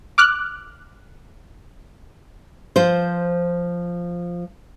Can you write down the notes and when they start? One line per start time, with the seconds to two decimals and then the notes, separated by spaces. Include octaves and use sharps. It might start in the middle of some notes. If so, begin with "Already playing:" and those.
0.18 D6 F6 F#6
2.76 F3 C5